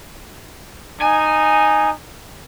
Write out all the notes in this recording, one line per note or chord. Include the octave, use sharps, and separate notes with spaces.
D#4 G#5